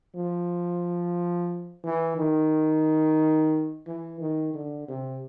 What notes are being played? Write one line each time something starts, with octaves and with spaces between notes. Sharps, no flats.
F3
E3
D#3
E3
D#3
D3
C3